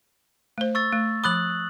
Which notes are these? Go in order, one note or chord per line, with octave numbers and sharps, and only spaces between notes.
A3 C5
C#6 E6 A6
A3
F3 B5 D#6 F#6 F#7